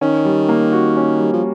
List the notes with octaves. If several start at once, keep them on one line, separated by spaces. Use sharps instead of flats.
D#3 C#4
G3
A#3
F#4
C#4
G3
F3